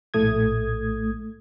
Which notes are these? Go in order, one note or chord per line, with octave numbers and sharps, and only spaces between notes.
A#1 A2 A3 D#6 G#6